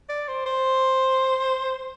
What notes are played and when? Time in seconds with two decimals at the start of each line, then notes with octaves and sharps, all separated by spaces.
0.10 D5
0.28 C5
0.46 C5